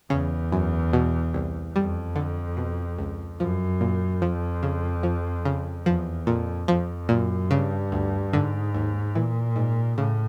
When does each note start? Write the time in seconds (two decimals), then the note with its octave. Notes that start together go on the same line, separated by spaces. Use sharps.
0.10 E2 C#3
0.52 F#2
0.93 B2
1.34 C2
1.75 F2 G3
2.16 D3
2.57 B2
2.98 C#2
3.39 F#2 F3
3.81 A#2
4.22 F2 F3
4.63 C#3
5.03 F3
5.45 C#3
5.86 E2 F3
6.27 F2 A#2
6.68 F2 F3
7.09 F#2 A#2
7.51 G2 C#3
7.92 D2
8.32 G#2 D3
8.74 D#2
9.15 A#2 E3
9.56 G#2
9.97 A2 C#3